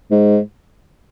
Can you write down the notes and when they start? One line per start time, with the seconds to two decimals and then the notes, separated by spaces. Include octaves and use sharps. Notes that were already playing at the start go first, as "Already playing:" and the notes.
0.11 G#2